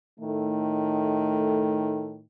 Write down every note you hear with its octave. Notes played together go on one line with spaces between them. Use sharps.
A2 D#3 A3